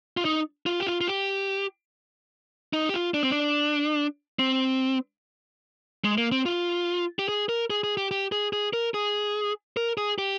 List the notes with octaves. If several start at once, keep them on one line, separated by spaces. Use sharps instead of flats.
F4
D#4
F4
G4
F4
F4
G4
D#4
G4
F4
D4
C4
D4
C4
G#3
A#3
C4
F4
G4
G#4
A#4
G#4
G#4
G4
G4
G#4
G#4
A#4
G#4
A#4
G#4
G4